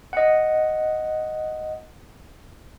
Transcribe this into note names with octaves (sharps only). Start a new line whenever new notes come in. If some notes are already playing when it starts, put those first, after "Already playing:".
D#5 F#5